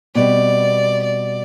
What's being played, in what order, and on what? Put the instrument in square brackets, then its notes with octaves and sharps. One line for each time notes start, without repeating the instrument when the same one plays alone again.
[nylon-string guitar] B2 G3 C4 [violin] D5
[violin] D5